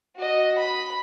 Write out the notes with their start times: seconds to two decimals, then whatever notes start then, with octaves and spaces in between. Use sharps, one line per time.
0.16 F#4 D#5
0.58 B5